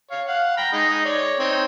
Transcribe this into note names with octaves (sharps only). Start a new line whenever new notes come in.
C#5 F5
F5 F#5
G5 A#5 B5
G#3 D#4 D#5
C#5 D5
C4 D#4 C#5